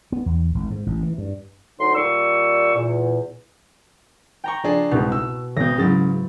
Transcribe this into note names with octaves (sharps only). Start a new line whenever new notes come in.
B3
E2
G#1
G#2
A1
E3
G2
D2 F#3 D#4 C6
A#2 G3 C#6 E6
E2 A#2
G5 A#5 C#6
F3 D4 G#4
C2 G#2 B2
E6
G#1 B2 G6 A#6
G#2 C#3 F#3 E4 A6